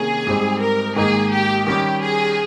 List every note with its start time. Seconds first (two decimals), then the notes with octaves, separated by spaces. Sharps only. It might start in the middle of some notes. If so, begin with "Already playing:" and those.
Already playing: C3 D#3 A#3 C#4 G#4
0.27 G#2 G3 C4 D#4
0.62 A#4
0.96 G#2 D#3 A#3 D#4 G#4
1.31 G4
1.67 D#3 G3 C#4 G4
2.01 G#4